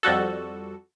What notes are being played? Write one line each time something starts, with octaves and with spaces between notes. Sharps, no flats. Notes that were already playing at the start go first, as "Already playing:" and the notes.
F2 G3 F#4 A4